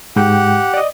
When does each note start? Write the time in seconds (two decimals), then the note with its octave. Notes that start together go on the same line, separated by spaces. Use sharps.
0.16 G#2 G#3 G4 F#5 G5
0.74 D5 D#5